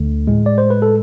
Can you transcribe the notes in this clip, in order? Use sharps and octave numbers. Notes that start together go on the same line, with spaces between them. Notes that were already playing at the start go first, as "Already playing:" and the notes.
Already playing: D2 D3 A3
A2 G#3
D5
C5
B4
A4